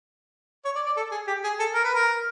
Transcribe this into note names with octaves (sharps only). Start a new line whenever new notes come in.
C#5
D5
D5
A4
G#4
G4
G#4
A4
A#4
B4
A#4